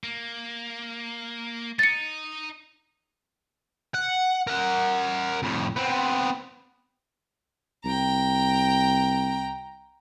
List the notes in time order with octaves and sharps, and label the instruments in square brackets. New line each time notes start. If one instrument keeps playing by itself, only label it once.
[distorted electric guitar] A#3
[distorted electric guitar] D#4 [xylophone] A6 C#7
[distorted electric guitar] F#5
A#4 F#5
F2 A2
B3 C4
[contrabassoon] C2 [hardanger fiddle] G5 A#5